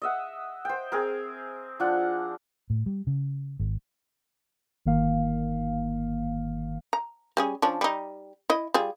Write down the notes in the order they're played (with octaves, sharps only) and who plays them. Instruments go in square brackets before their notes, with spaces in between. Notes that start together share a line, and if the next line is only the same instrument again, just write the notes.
[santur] D#5 E5 F#5
C5 G5
C4 G#4 A#4
F3 D4 F4 F#5
[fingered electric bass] A2
G3
C#3
G#1
[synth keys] G1 D#3 A#3 F5
[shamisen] A#5
G3 C#4 G#4
F3 C#4 D4
G3 D#4
E4 D#5
G3 F4 G#4